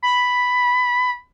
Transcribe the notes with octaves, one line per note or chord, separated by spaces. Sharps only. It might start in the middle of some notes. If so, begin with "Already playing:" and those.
B5